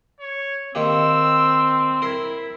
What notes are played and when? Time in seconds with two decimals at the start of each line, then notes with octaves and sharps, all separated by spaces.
0.20 C#5
0.75 D#3 A#3 C4 G4 E6
2.02 E4 A#4 C6